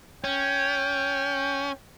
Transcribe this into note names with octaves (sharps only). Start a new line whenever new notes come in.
C#4 G5